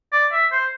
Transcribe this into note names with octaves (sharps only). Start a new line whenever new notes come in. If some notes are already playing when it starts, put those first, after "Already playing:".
D5
E5
C5